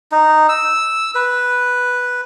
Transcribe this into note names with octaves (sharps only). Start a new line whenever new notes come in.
D#4
E6
B4